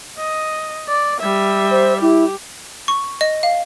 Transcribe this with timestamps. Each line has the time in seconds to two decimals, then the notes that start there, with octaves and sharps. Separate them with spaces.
0.18 D#5
0.89 D5
1.20 G3 E5
1.71 C5
2.01 E4 G4
2.88 C#6
3.21 D#5
3.43 F5